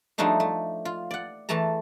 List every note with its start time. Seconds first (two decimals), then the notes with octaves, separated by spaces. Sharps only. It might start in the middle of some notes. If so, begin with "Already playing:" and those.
0.18 F3 G3 A3 D4 D#4 G#4
0.40 A3
0.85 F4
1.11 D5 F#5
1.49 E2 E3 A3 A5 A#5